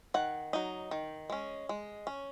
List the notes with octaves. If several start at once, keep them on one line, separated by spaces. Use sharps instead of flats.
D#3 F#5
F#3 D#4
D#3
G#3 C#4
G#3
C#4